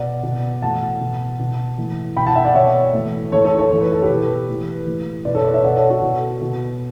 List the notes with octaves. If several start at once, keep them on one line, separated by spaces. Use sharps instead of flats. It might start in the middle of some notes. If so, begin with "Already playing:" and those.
Already playing: B2 D5 F#5
B2
A2 E3 F#5 A5
B2
B2
A2 E3
B2 G5 B5
F#5 A5
E5 G5
D5 F#5
B2 C#5 E5
A2 E3
A2 E3 A4 C#5
A4 C#5
A4 C#5
A2 E3 C#5
B4
A4
G4 B4
B2
A2 E3
A2 E3
B2 B4 D5
A4 C#5
B4 D5
C#5 E5
B2 D5 F#5
A4 C#5
F#4 A4
B2
B2